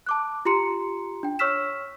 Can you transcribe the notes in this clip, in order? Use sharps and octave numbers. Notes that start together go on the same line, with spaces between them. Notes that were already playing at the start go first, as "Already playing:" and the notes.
A5 D6 F#6
F4 G4 A#5 C6 C#7
D4 G5
C#5 C#6 E6 F6 B6 E7